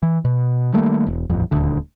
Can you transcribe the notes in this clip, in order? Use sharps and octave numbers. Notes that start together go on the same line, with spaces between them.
E3
B2
D#3 G3 A3 A#3
E1
D#1 A1 F2
D#1 D2 D3